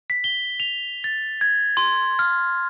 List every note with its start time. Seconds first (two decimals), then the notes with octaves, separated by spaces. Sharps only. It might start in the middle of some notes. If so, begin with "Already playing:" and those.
0.10 B6
0.24 G7
0.60 F7
1.04 A6
1.41 G#6
1.77 C6
2.19 F6